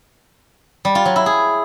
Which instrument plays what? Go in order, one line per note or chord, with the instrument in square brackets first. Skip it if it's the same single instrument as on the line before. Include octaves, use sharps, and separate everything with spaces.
[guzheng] G3
F4
F#3
E4
G#4